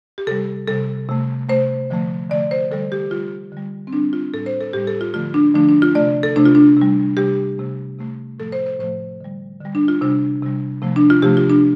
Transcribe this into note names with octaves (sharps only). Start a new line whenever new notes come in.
G4
C3 G3 A4
C3 G3 A4
C3 A3
C3 A3 C5
D3 F3 A3
D3 F3 A3 D5
C5
D3 G3 A4
G4
D3 G3 F4
D3 G3
C4
D3 G3 D4
F4
A2 G3 A4
C5
A4
A2 G3 G4
A4
F4
D3 F3 A3 F4
D4
D3 F3 A3 D4
D4
F4
C3 A3 D5
A4
C3 A3 D4
F4
D4
C3
G3
C3 G3 G4
C3 A3
C3 A3
A2 F3 A3 A4
C5
C5
A2 F3 A3 C5
D3 G3
D3 G3
D4
F4
C3 G3 D4
C3 G3
C3 F3 A3
D4
F4
C3 F3 A3 G4
F4
D4